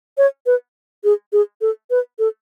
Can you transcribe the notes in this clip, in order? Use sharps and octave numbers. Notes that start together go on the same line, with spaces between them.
C#5
B4
G#4
G#4
A4
B4
A4